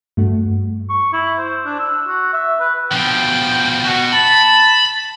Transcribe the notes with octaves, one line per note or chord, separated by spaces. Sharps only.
G2 A3 F#4
C#6
E4
C5
D4
E6
F#4
E5
B4
B2 F3 G5
B2 F#4
A5 B5